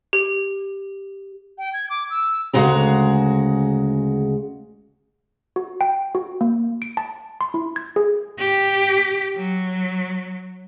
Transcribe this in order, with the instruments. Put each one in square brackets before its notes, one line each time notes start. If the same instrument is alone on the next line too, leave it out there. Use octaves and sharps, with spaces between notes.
[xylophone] G4
[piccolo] G5
G#6
D6
E6
[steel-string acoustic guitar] D2 C#3 G#3 F#4 A#5
[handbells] F#4
G5
F#4
A#3
D7
A5
C6
E4
G#6
G#4
[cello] G4
F#3